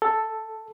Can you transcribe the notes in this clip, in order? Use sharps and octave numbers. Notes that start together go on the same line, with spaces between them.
A4